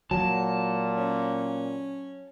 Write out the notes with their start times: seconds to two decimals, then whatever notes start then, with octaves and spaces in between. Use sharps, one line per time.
0.11 A#2 F#3 A5
0.96 C#4